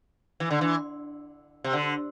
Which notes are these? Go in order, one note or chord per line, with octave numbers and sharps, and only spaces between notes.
E3
D3
E3
C3
D3